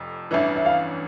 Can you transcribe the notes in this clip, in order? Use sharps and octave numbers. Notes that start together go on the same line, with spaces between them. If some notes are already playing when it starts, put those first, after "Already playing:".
Already playing: F1 F2
A1 G2 E3 E5
E5
F5